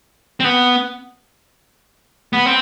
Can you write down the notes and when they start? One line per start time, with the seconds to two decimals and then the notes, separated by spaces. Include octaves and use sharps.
0.40 C4
0.44 B3
2.33 B3
2.46 C4